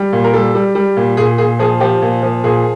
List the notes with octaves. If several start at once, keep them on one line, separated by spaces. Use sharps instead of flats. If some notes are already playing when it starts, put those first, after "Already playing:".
Already playing: G3
A#2
A#4
G3 A4
G3
G3
A#2
A#2 G#4
A#2 G#4
F3 G#4
F3 G4
A#2
F3
A#2 G#4